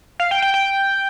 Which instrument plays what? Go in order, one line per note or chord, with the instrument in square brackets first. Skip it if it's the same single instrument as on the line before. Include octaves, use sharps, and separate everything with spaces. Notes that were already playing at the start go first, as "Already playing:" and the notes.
[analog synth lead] F5
G5
G5
G5